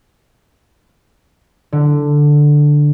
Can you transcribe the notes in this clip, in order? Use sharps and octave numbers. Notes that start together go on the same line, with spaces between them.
D3